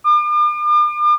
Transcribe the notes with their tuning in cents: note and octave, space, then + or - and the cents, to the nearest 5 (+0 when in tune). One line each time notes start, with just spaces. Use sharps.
D6 +40